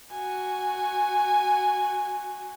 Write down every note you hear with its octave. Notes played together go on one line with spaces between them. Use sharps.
F#4 G#5